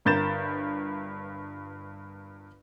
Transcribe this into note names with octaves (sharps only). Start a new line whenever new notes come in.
G1 G2 A#4 G6 A6 E7